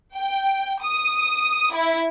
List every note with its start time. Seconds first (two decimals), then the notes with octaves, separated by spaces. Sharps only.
0.15 G5
0.82 D#6
1.73 E4